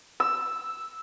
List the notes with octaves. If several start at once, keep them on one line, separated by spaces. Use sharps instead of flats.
E6